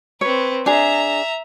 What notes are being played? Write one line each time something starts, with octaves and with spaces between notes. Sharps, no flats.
C4 B4 C#5
D4 G#4 E5 A#5